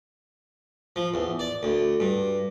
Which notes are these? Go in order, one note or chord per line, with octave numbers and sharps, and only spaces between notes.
F3
E2
D5
D2
G2